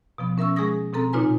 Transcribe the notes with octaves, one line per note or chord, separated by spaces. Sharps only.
B2 F3 B3
C#4 A#4 E5 C#6 E6
G#3 G#4 C#6 D#6 A#6
B2 C4 A4 A#5
A#2 C#3 D#4 F4 B4 G#5